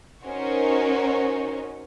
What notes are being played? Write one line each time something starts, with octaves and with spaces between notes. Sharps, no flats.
C#4 D#4 F#4 A#4 C5 C#5